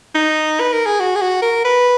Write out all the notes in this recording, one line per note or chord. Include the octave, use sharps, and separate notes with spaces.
D#4
B4
A#4
G#4
F#4
G#4
F#4
A#4
B4